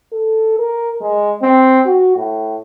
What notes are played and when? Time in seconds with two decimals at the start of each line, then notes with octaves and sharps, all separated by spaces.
0.12 A4
0.59 A#4
1.01 G#3
1.42 C4
1.86 F#4
2.16 A2